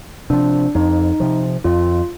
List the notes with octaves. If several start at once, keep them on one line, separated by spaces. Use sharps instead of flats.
C3 F3 D4
F2 D#4
C3 F3
F2 F4